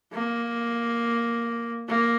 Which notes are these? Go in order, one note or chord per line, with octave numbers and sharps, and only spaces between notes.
A#3
A#3